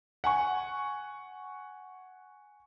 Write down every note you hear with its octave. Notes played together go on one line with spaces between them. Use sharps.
F#5 G#5 C#6